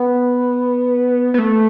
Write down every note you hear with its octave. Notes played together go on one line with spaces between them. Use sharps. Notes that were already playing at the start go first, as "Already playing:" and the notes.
Already playing: B3
B3
A3